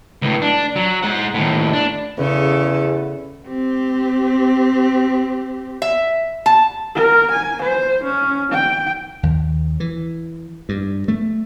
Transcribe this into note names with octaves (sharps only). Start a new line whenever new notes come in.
C#2 A2
D4
F#3
G#3 F#5
D#2 A2
D4
E2 C#3 A4
C4 G4
E5
A5
A#4
G#5
C5
C#4
G5
D#2
E3
G2
A3